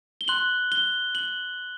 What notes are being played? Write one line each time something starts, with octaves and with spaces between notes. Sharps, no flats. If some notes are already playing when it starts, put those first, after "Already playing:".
G7
C6 F#6 F#7
G7
F#7